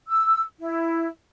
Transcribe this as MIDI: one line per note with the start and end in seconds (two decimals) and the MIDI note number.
0.07 0.42 88
0.60 1.08 64